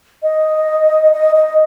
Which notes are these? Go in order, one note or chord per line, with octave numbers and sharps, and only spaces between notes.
D#5
D#5
D#5